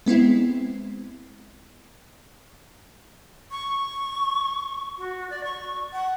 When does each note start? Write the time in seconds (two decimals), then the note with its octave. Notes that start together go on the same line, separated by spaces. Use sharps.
0.06 G#3 B3 C4 E4
3.50 C#6
4.98 F#4
5.30 D5
5.44 C#6
5.93 F#5